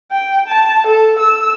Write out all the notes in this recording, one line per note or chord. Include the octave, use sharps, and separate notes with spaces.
G5
A5
A4
E6